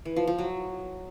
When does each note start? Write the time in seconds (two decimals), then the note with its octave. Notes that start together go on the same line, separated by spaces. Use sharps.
0.05 E3
0.16 F3
0.27 F3
0.38 F#3